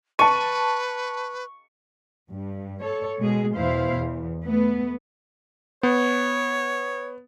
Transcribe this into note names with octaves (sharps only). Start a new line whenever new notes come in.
B4 A5 C#6 D#7
G2
A4 C#5
B2 G#3 G#4
E2 B2 E4 C5 F5
E2
A3 B3
B3 C#5